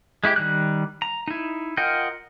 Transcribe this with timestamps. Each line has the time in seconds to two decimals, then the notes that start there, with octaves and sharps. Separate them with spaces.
0.24 G#3 E4 F#4 G4
0.36 D#3 G3 F#6
1.02 A#5
1.28 D#4 E4
1.77 F4 A#4 D#5 F#5 G5